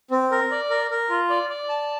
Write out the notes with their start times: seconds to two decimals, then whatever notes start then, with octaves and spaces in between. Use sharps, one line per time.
0.11 C4
0.31 A#4
0.51 D5
0.70 A#4
0.91 A#4
1.10 F4
1.30 D5
1.49 D5
1.69 A5